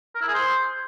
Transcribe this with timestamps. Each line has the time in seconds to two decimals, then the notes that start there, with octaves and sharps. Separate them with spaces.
0.15 A#4
0.22 E4
0.28 G#4
0.34 C5